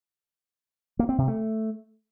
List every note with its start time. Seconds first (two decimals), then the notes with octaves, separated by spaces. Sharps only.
0.99 A#3
1.09 C4
1.18 C3
1.28 A3